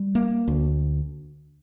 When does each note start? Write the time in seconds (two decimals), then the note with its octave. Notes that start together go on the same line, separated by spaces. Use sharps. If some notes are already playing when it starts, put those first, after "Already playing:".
Already playing: G3
0.15 A#3
0.48 D2